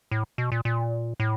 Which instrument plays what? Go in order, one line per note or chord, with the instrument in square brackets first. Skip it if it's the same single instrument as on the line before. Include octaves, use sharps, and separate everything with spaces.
[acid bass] A2
B2
A#2
A#2
A2